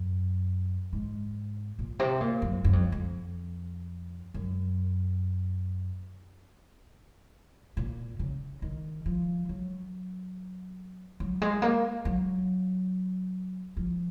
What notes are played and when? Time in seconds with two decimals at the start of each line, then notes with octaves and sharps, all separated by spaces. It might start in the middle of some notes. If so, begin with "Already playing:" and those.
Already playing: F#2
0.93 G#2
1.79 A#2
1.99 C3
2.20 A#2
2.42 F#2
2.64 F#2
2.73 F2
2.92 F2
4.34 F#2
7.77 A#2
8.19 C#3
8.62 D#3
9.06 F3
9.49 F#3
11.20 F#3
11.42 G#3
11.62 A#3
12.05 F#3
13.77 F3